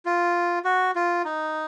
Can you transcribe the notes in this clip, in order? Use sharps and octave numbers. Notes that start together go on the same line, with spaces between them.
F4
F#4
F4
D#4